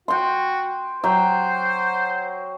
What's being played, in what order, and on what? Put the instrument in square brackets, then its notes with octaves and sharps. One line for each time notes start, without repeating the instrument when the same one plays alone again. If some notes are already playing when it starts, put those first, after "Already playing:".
[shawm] F#4 [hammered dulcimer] G5 C6
[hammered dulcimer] F#3 G5 [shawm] C5